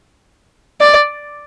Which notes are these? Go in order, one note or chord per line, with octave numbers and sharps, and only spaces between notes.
D5